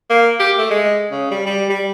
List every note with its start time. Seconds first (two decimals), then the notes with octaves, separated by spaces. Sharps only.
0.10 A#3
0.40 G4
0.58 A3
0.70 G#3
1.11 C#3
1.31 G3
1.46 G3
1.69 G3